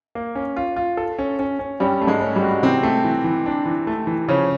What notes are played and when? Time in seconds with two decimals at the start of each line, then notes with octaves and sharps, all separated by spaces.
0.15 A#3
0.35 C#4
0.56 F4
0.76 F4
0.97 A4
1.19 C#4
1.39 C#4
1.59 C#4
1.80 G2 G3 C#4
2.02 A3
2.07 G#2 G#3
2.21 C#4
2.36 G2 G3
2.42 F#4
2.63 C3 E3 C4
2.83 A3
3.04 E3
3.24 E3
3.46 D4
3.65 E3
3.87 A3
4.07 E3
4.28 C#3 F3 C#4